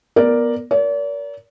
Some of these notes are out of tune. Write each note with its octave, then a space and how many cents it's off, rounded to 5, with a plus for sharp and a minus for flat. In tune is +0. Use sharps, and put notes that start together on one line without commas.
B3 -15 A#4 +0 D5 +0
A#4 +10 D5 -45